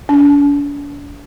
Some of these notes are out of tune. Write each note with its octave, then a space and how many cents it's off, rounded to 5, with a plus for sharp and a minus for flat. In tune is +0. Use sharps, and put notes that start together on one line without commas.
D4 -40